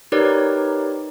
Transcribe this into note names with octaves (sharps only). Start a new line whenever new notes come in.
D#4 G4 A#4 B4 C#5 D5